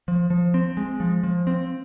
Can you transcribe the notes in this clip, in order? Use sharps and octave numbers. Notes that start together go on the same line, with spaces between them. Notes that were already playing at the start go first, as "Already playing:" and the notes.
F3
F3
C4
G#3
F3
F3
C4